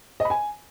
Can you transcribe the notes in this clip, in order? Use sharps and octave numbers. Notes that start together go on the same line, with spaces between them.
D#5
B5
G#5